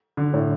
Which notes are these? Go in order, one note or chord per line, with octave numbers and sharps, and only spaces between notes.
D3
A2